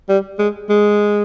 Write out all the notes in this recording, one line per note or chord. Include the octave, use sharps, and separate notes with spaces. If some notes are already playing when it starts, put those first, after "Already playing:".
G3
G#3
G#3